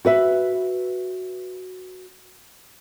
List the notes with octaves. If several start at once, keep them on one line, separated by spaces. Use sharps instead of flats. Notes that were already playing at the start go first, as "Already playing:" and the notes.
F#4 B4 E5